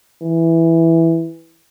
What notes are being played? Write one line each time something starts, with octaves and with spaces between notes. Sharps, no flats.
E3